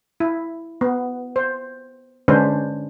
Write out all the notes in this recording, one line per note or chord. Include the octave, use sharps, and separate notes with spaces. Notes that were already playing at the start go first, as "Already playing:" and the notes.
E4
B3
C5
D3 G#3 C#4 D4 B4 C5